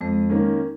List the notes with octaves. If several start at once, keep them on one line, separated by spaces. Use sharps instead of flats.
F2 G#3
D#3 A#3 C#4